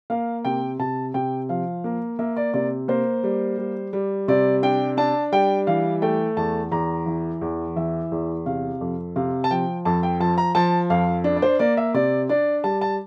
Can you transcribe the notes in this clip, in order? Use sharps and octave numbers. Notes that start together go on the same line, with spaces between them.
A#3 F5
C3 G5
C3 A5
C3 G5
F3 F5
A#3
A#3 E5
D5
C3 D5
A#3 C5
G3
G3
G3
C3 D5
D4 G5
D4 A5
G3 G5
E3 F5
A3 G5
E2 A5
E2 A#5
E3
E2
E3 E5
E2
C3 F5
F2
C3 F5
A5
F3 G5
F2 A5
G5
F3 A5
A#5
F3 A5
F2 F5
D4
D5
C5
A#3 D5
E5
C3 D5
D4 D5
G3 A5
A5